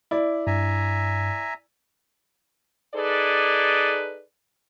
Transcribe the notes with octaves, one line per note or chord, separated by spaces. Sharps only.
E4 D5
G2 E5 G#5 A#5
D#4 G#4 A4 B4 D5